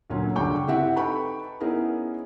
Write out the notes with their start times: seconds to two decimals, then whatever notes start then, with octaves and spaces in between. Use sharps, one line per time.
0.10 D2 A#2 F#3 C#4
0.35 D2 G2 C#3 G5 C#6 D6
0.67 C4 E4 G4 E5 F#5
0.96 D#4 A4 B4 G5 B5 C#6
1.60 B3 C#4 D#4 E4 G#4 A#4